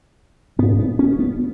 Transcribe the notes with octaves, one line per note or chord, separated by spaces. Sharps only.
G#2 B3
B3
C#4
B3